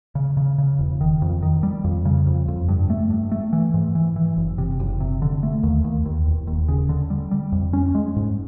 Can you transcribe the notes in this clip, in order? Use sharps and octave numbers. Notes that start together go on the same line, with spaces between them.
C#3
C#3
C#3
E1
D#3
F2
D#3
G3
F2
C#3
F2
F2
G2
A3
G2
A3
E3
G#2
E3
E3
F#1
C3
F#1
C3
D3
A3
D#2
D#2
D#2
E1
D#2
C#3
D3
G3
G3
F2
C#4
G#3
G#2